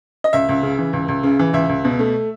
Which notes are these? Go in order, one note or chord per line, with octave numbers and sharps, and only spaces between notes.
D#5
C#2 E5
C#2
C#3
E3
C#2
C#2
C#3
E3
C#2 E5
C#2
B2
A3